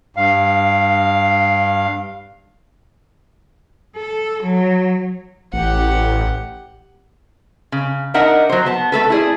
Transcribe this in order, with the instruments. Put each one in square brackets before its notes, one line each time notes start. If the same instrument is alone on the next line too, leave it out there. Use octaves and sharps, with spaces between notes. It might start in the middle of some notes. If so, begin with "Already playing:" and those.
[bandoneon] G2 F5
[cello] A4
F#3
[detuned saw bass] A1 [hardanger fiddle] G4 F#5
[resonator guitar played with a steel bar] C#3
D4 D#4 A#4 D#5 E5 F#5
F#3 C5
B3 A5
A3 A4 B4
E4 G#4 D5